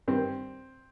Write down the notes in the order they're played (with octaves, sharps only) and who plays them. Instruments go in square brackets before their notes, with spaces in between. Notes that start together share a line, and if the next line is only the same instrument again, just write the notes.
[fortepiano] G2 D#3 C4